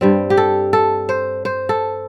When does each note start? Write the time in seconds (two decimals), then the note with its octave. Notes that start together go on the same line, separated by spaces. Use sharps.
0.01 G2 G3 C4
0.30 G4
0.37 A4
0.73 A4
1.09 C5
1.45 C5
1.69 A4